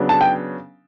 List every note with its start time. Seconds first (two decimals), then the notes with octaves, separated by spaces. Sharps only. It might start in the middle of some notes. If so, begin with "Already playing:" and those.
Already playing: C#3 F#3 B3 D4
0.09 A5
0.21 G5